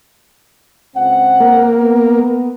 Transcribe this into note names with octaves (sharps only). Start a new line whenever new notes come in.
C#2 C4 F#5
A#3
B3